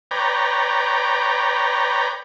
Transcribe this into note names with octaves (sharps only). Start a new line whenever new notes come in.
B4 C#5 D5 G5 A#5